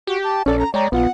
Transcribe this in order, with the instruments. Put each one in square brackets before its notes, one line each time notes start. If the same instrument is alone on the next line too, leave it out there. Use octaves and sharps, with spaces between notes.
[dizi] F#4 [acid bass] G4
[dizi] A5
[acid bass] A#1 [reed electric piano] C#4 A4 [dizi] D5
[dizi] A#5
[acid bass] G#3 [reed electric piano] C#5 G5 A#5 [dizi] D5
[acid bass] A#1 [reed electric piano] B3 F4 [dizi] F#5